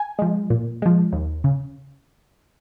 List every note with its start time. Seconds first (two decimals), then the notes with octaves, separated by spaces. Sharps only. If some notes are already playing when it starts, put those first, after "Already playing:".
Already playing: G#5
0.19 F3 G#3
0.50 A#2
0.82 F3 G#3
1.12 D#2
1.44 C#3